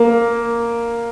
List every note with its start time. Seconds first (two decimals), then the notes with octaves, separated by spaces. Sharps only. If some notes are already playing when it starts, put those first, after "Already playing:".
Already playing: A#3